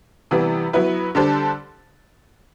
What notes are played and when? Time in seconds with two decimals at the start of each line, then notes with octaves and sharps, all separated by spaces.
0.31 C3 E3 G3 B3
0.73 F#3 B3 E4 B4
1.15 D3 G3 D4 A4 C5